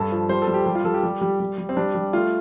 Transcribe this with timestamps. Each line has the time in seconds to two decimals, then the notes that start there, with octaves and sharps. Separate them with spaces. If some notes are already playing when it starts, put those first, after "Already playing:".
Already playing: G2 A4
0.12 F3
0.29 G3 C5
0.42 A4
0.47 G3
0.54 G4
0.66 G3 G4
0.75 F4
0.85 G3 A4
0.94 G4
1.03 G3
1.21 G3
1.40 G3
1.58 G3
1.69 C4
1.77 G3 D4
1.95 G3
2.13 A3 F4